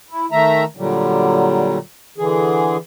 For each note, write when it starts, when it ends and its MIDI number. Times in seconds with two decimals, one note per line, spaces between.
0.10 0.26 64
0.31 0.64 51
0.31 0.64 57
0.31 0.64 76
0.31 0.64 82
0.77 1.78 46
0.77 1.78 50
0.77 1.78 54
0.77 1.78 55
2.18 2.77 50
2.18 2.77 52
2.18 2.77 68